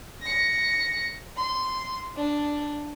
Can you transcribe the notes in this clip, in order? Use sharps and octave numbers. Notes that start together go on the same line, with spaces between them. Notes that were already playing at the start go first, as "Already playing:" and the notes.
A#6 C#7
C6
D4